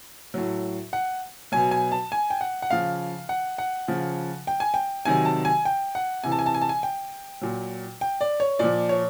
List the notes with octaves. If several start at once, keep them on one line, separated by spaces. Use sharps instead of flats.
A2 F#3
F#5
B2 F#3 G#5
G#5
A5
G#5
G5
F#5
F#5
C#3 F3 F5
F#5
F#5
C#3 F3
G5
G#5
G5
C3 D#3 F#3 G#5
A5
G#5
G5
F#5
C3 E3 G#5
A5
G#5
A5
G#5
A5
G#5
G5
A#2 F#3
G5
D5
C#5
A#2 F3 D5
C#5